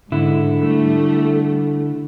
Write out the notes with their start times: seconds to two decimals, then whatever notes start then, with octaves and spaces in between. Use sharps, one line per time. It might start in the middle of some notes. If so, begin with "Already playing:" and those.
0.12 G#2 D3 E4
0.58 G3 A3